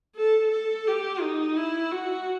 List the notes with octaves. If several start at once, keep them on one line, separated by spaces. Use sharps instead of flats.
A4
A4
G4
D#4
E4
F#4